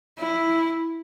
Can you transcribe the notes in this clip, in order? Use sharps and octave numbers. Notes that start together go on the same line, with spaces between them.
E4